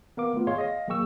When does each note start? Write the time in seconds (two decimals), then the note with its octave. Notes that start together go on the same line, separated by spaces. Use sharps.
0.17 B3 A#4 F5 D6
0.34 A3 B3 F4
0.47 G#4 C#5 D#5 F5 C6
0.58 D#5 F5 A#6
0.88 F#3 A#3 G#4 G5 C#6 E6